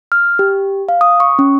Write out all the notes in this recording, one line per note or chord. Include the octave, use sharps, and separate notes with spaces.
F6
G4
F5
D#6
C#6
C#4